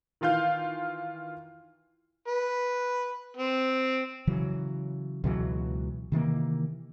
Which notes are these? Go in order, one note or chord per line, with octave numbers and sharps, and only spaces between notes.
D#3 E3 F4 F5 G6
B4
C4
C#3 E3 F#3
C#2 B2 E3 F#3
C3 D#3 E3 A#3